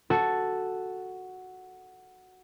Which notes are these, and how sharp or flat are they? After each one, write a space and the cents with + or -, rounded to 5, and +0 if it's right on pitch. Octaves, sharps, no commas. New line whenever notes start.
F#4 +0 A4 +0